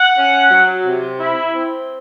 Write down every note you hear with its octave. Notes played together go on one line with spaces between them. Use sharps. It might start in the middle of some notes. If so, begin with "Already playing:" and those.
Already playing: F#5
C#4
F#3
C3
E4
C4